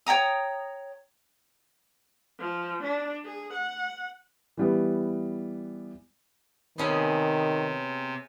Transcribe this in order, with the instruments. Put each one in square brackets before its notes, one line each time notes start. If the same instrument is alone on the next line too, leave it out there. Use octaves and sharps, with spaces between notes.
[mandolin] C#5 G5 A#5 D#6
[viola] F3
D4
G#4
F#5
[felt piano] E3 G3 B3
[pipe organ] C3 [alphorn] D#3 [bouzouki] B3 C#4 G#4